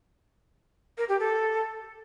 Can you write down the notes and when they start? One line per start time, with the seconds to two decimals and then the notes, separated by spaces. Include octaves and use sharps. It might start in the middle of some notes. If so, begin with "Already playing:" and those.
0.98 A#4
1.09 G4
1.20 A4